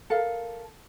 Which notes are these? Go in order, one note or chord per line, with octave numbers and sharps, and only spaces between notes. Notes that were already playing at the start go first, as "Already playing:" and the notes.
A4 A#4 F5